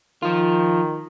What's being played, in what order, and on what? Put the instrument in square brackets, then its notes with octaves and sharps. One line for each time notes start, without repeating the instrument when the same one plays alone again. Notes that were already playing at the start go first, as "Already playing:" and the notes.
[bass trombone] D#3 [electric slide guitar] F3 F4